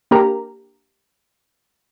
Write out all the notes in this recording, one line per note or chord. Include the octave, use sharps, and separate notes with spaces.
A#3 D4 G4 A#4 A#5